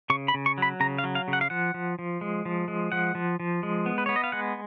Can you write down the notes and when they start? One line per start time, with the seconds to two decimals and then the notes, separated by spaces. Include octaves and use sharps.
0.10 C#3 C#6
0.28 B5
0.34 C#3
0.46 C#6
0.58 F#3 B5
0.80 C#3 A#5
0.98 F5
1.04 F#3
1.15 F5
1.28 C#3
1.33 F#5
1.41 F5
1.50 F3 F#5
1.74 F3
1.99 F3
2.21 G#3
2.45 F3
2.68 G#3
2.92 F3 F#5
3.15 F3
3.40 F3
3.63 G#3
3.86 B3
3.98 B4
4.06 B3 C#5
4.16 D#5
4.24 F5
4.32 G#3 F#5